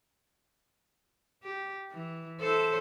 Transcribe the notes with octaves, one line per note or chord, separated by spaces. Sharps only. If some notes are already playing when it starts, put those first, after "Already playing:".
G4
E3
E4 A4 C5